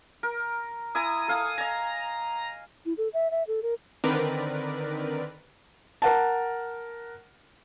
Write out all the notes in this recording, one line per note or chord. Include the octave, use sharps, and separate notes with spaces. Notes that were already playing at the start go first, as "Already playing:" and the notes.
A#4
E4 G#5 A#5 D#6
A4 F5 G#5
D#5 G#5 A#5
E4
A4
E5
E5
A4
A#4
D3 D#3 C4 A#4 B4 D5
A#4 F#5 A5